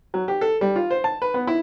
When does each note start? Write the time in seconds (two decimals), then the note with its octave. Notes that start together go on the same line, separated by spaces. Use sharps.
0.14 F#3
0.28 G4
0.41 A4
0.61 G3
0.76 F4
0.90 C5
1.04 A5
1.22 B4
1.34 B3
1.47 E4